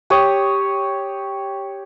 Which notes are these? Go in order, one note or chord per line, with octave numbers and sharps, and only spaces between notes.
G4 C#5 D#6